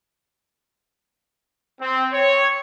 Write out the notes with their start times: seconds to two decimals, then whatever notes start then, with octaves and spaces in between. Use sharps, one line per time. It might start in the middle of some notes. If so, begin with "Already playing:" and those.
1.80 C4
2.12 C#5